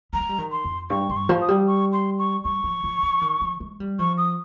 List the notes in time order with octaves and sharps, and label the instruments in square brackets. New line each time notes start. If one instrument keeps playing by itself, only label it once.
[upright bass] G3 [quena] A#5
[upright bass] G#3
G3
D#3
[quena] C6
[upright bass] F2
[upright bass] G2 [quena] C#6
[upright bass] G2 [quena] C6
[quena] C#6
[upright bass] F3
[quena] D#6
[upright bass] G3
[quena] C#6
C6
C#6
[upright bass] G3 [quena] C#6
[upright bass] F3
F3
F3
D#3
F3
G#3
G3
[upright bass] F3 [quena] C#6
[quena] D#6